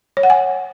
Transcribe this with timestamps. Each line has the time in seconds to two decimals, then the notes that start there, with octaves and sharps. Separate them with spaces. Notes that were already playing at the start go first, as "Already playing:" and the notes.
0.17 C#5
0.23 F#5
0.30 G#5